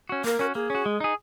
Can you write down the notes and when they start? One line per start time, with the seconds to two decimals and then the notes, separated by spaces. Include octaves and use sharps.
0.09 C#4 F#4
0.24 A#3 A#4
0.39 C#4 F#4
0.55 A#3 G#4
0.70 C#4 F#4
0.86 G#3
1.00 D#4 G#4